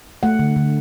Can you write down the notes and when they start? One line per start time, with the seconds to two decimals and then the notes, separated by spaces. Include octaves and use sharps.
0.23 A3 F#5
0.39 D3
0.56 D3